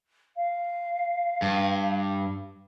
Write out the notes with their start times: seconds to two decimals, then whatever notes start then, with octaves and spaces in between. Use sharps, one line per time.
0.36 F5
1.42 G2